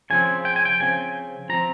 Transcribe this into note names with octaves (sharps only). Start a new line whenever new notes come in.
C#3 F3 C4 G#5
G5
G#5
G5
C#3 F3 C4 G#5
F3 C4 A#5